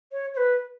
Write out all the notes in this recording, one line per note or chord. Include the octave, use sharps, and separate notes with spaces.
C#5
C#5
B4